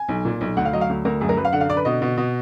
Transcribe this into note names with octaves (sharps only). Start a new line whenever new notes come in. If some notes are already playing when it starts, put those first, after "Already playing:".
Already playing: G#5
B1
A#2
B1
D2 F#5
F5
F#3 D#5
F5
D2
D2 A#4
F#2 G#4
A#4
F#2 B4
F5
D3 F#5
F5
D3 D5
B4
B2 D#5
B2
B2